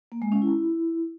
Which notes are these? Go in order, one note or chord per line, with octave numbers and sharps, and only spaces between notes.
A#3
G#3
C#4
E4